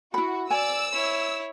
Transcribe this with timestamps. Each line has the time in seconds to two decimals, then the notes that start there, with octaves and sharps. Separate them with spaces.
0.14 E4 F#4 B5
0.50 D5 G#5 E6
0.92 E4 C#5